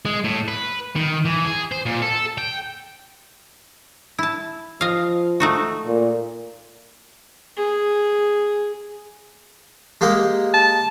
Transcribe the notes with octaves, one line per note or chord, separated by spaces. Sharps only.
G#3
A2
B4
D#3
E3
G#4
C5
A#2
A4
G5
E4 A5
F3 D#5 F5
A3 D#4 F#4
A#2
G#4
G#3 A#3 G4
A5